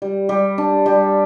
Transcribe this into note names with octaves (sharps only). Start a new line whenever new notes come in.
G3
G3
D4
G3